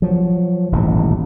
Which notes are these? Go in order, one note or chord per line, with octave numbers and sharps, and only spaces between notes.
F3 F#3
D#1 A1 G#2 B2